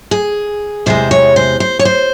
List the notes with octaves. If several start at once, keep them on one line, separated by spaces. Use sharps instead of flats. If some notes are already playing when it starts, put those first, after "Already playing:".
G#4
E2 C3 E3 G#3 C5
C#5
C5
C5
C#5
C5